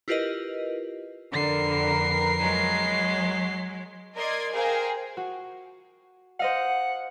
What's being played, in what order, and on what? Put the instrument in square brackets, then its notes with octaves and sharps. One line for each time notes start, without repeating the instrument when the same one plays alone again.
[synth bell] E4 F4 G4 A#4 B4 D#5
[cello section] F2 A#4 B4 [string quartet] D3 [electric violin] C7
[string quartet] F#3 G#3
[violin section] A#4 D5 D#5 C6 G#6
G#4 A#4 C5 F5 G5
[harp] F#4
[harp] C5 D#5 F5 [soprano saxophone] F#5